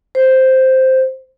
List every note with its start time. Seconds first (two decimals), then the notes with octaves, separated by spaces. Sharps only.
0.15 C5